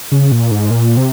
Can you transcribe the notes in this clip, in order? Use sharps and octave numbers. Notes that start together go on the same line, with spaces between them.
C#3
A#2
G#2
A#2
C3